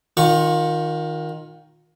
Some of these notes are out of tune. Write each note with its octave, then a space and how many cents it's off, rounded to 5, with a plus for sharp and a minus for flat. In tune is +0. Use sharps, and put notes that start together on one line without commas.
D#3 +0 F4 +30 C#6 +0